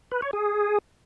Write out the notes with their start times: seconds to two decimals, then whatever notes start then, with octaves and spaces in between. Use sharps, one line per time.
0.11 B4
0.22 C#5
0.33 G#4